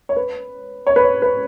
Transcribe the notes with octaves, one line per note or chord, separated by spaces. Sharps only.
C#5
B4
C#5
B4
C#5
B4